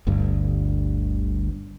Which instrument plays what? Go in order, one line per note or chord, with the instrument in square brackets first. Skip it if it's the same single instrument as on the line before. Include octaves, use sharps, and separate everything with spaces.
[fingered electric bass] G1 D2 G2